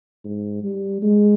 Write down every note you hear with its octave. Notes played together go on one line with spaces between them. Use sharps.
G#2
G3
G#3